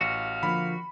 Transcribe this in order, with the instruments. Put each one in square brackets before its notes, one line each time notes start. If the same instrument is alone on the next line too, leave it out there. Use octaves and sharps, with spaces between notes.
[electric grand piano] A1 [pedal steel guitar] F#4 [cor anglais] F5
[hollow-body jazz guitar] D3 F3 A#3 [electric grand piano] B5